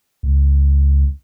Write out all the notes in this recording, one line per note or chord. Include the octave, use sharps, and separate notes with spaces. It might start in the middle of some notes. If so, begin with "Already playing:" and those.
C#2